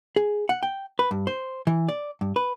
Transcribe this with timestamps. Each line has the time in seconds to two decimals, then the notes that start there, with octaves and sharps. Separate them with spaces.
0.16 G#4
0.49 F#5
0.63 G5
0.99 B4
1.11 G2
1.27 C5
1.67 E3
1.89 D5
2.21 G2
2.36 B4